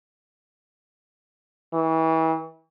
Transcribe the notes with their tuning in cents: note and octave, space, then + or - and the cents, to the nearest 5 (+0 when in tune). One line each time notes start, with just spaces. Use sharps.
E3 -35